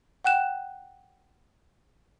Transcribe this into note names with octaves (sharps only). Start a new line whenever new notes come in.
F#5 G5 F#6 E7